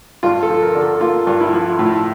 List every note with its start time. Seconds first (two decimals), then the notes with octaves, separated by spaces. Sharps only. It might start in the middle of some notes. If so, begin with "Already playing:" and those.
0.23 G2 F4
0.43 A4
0.49 F3
0.63 A#4
0.75 D3
0.82 A4
1.01 A#3 F4
1.27 G2
1.40 E4
1.53 F3
1.79 A2